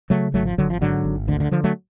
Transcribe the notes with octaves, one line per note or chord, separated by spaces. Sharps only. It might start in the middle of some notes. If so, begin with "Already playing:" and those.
C#3 F#3 A3
G#1 F#3 A3
F3
G#1 D3 F#3
F3
G#2 D3 F#3
G#1
D2 D3
D3
D3 F3
F#3 A3